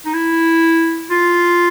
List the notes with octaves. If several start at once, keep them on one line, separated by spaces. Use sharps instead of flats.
D#4
E4
F4